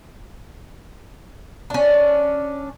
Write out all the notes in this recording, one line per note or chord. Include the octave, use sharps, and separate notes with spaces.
C#4 D4